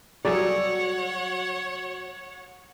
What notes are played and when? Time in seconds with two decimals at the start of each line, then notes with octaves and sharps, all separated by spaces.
0.25 F#3 G3 G#4 A4 C#5 D5 F#5